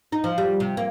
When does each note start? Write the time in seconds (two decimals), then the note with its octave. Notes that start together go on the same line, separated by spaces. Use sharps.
0.12 D#4
0.24 F3
0.38 G3
0.60 C3
0.77 A#3